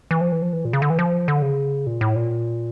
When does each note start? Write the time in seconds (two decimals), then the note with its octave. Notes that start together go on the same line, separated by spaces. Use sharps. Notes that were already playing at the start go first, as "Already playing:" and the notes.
0.11 E3
0.21 F3
0.32 E3
0.42 F3
0.53 E3
0.65 A#2
0.73 C#3
0.82 D3
0.90 E3
0.99 F3
1.28 D3
1.42 C#3
1.86 A#2
2.01 A2
2.16 A#2